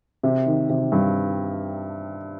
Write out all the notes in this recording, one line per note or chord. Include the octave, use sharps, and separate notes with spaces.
C3
D#3
C3
G2